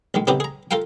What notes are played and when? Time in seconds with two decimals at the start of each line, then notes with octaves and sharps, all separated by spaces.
0.14 A#1 D#3 G#3
0.27 C#3 B3 C4 D#4 G4 A#4
0.40 G#4 A#5
0.71 F4 A4 A#4 F5 G5